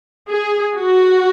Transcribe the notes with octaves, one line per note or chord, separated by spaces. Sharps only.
G#4
F#4